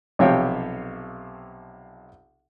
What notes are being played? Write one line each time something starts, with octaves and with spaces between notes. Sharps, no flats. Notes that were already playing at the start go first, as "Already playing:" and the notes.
B1 C3 F3 C#5 F5 G5